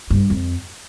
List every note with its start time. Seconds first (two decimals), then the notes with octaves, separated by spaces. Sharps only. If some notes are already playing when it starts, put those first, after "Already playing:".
0.10 G2
0.30 F2